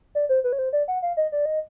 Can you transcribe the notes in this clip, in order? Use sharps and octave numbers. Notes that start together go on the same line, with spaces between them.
D5
C5
B4
C#5
C5
D5
F#5
F5
D#5
D5
D#5